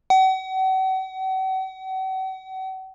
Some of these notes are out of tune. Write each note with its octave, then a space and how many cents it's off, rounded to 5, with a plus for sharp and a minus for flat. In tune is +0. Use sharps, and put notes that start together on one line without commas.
F#5 +40